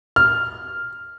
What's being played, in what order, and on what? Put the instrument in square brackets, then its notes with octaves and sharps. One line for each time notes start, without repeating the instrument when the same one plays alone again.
[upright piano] F6